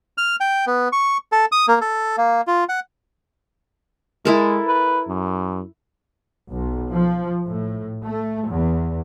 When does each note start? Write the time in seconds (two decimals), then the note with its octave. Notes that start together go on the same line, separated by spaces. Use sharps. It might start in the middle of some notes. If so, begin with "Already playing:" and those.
0.18 F6
0.40 G5
0.67 B3
0.92 C#6
1.32 A4
1.52 D#6
1.68 A#3
1.81 A4
2.17 A#3
2.47 F4
2.69 F#5
4.25 G#3 E4 A4 A#4
4.67 B4
5.08 F#2
6.51 B1
6.92 F3
7.47 A2
8.03 A3
8.48 E2